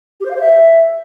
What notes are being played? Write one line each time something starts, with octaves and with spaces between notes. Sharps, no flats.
G4
C5
F5
C5
E5